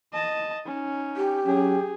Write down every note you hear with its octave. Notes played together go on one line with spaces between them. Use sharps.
D#5 A5
C#4 D#4
G4
F#3 C#4 G#4